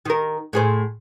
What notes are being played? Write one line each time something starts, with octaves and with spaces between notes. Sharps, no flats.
D#3 A#4
A2 G#4 C5